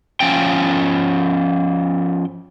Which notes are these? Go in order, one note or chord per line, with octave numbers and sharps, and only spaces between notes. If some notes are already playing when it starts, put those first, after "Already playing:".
F3 C#4 G5